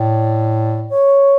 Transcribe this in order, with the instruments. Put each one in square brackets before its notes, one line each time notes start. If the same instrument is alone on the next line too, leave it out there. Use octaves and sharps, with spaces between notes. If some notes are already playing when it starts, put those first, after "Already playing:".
Already playing: [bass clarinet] A2 [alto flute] D5
[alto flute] C#5